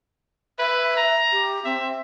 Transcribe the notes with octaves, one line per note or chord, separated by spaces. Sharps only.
B4 E5
A#5
G4
C4 E5